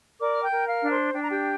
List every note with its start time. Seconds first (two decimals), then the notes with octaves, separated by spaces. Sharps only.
0.20 A#4 D5 D6
0.32 F6
0.43 G5 G6
0.51 A#4
0.67 F5 F6
0.82 D4
0.90 C5 C6
1.14 D4 G5
1.22 A#5
1.29 G4 G5